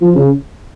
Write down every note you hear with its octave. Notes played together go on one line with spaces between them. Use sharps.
F3
C#3